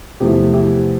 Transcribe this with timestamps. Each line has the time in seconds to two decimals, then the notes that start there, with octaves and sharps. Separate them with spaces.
0.20 E2 C3 F3 A3 E4 G4
0.53 E4 G4